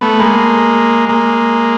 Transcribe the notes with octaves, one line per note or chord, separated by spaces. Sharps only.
A3 B3
G#3 A#3
G#3 A#3